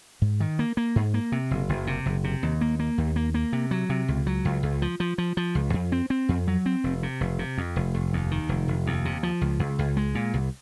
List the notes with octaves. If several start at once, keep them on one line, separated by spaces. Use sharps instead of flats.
G#2
D#3
A#3
A#3
G#2
A#3
C3
F#1
F#1
C3
F#1
C3
D#2
A#3
A#3
D#2
A#3
A#3
C3
F#3
C3
C#2
F#3
C#2
C#2
F3
F3
F3
F3
C#2
F2
C4
C4
F2
F#3
C4
F1
C3
F1
C3
F2
F1
F1
D#2
D#3
F1
F1
D#2
C3
F3
C#2
C#2
C#2
G#3
A#2
C2